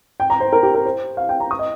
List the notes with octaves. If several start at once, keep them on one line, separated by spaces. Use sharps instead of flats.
G5
A#5
C5
A#4
G4
A#4
C5
F5
G5
A#5
D#6
D#5